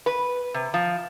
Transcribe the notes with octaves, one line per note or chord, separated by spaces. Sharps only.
B4
C3
F3